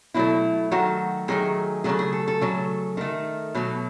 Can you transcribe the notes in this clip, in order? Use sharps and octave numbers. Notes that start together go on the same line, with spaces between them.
B2 F#3 A3 E4
D#3 F#3 A3 F#4
D#3 F#3 A3 G#4
C#3 F#3 A3 G#4
G#4
A4
A4
C#3 F#3 A3
D#3 A3
B2 F#3 A3